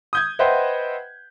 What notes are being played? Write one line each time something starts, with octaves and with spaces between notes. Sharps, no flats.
D#6 G6 G#6
B4 C5 D#5 E5 F#5 G5